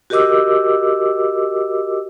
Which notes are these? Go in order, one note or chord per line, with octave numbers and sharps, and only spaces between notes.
F#4 G4 A#4 D#5 D6 E6